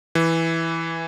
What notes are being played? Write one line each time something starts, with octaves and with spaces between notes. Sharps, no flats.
E3